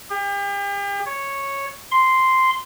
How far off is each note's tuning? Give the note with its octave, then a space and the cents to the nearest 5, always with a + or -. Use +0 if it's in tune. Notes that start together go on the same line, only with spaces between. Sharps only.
G4 +40
C#5 -5
C6 -5